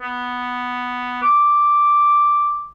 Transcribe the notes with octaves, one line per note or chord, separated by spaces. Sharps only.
B3
D6